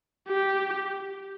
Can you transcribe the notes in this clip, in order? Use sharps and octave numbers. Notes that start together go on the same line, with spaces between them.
G4